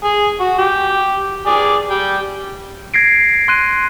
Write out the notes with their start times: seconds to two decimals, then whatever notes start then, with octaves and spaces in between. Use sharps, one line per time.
0.04 G#4
0.40 F#4
0.58 G4
1.47 G#4 D5
1.90 G3 G5
2.94 G#6 A#6 C7 D7
3.48 C6 F#6 D#7